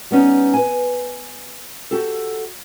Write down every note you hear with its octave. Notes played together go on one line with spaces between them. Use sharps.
G3 B3 C#4 D#4
B4 G#5
F#4 G4 A4